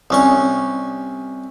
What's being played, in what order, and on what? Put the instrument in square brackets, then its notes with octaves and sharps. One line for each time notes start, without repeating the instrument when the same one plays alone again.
[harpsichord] C2 C#4 C#6